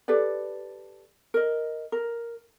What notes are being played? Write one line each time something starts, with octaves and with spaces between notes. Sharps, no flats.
G4 A4 B4 D5
A#4 D#5
A#4